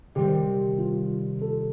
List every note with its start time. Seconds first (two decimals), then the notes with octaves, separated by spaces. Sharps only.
0.15 C3 D#3 G3 C4 G4
0.78 F4
1.41 A4